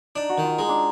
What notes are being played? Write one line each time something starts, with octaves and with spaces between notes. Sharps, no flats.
D4 D#4
F#4
D#3
F4
G#3 D#4
D4